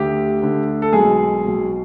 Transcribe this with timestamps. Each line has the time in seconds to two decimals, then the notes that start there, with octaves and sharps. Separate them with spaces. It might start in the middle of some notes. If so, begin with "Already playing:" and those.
Already playing: D2 D3 G4
0.42 D2 D3
0.82 A4
0.93 B1 B2 G#3 G#4
1.44 B1 B2